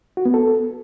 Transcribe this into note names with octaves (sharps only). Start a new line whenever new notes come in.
F#4
B3
A4